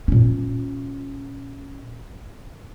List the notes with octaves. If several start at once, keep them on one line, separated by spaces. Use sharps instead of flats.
A#2 C#4